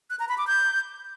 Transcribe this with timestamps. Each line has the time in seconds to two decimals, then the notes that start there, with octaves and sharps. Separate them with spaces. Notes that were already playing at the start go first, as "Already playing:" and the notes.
0.10 F#6
0.19 A#5
0.29 B5
0.38 D6
0.47 G6